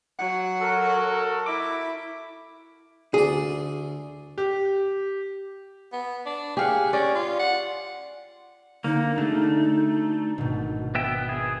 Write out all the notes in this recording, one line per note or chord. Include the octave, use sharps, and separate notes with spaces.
F#3 F#5
F#4 A4 A#4
E4 D6
D2 G#4 D5
G4
B3
D4
G4 G#4 F5 F#5
C#4 D5
F4
F#5
D3 A#3 C4 D#4
G#3 A3 D4 F#4
G#1 B2
B3 E5 G5
G#4